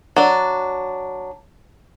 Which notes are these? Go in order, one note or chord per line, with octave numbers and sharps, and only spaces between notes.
F#3 D4